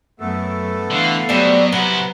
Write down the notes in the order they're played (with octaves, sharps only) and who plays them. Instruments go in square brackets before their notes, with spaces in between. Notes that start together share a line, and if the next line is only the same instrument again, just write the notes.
[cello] F#2 [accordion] A3 B3 A4
[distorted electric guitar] D3 [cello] E3 F5
[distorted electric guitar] B2 [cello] F#3 [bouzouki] G3 C4
[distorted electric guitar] C3 E4 [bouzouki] B3 [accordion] F#5 A#5